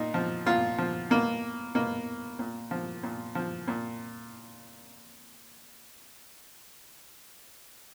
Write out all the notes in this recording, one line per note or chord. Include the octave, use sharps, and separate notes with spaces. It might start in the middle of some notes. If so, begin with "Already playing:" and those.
Already playing: A#2 D#4
F3
A#2 F4
F3
B2 A#3
B2 A#3
A#2
F3
A#2
F3
A#2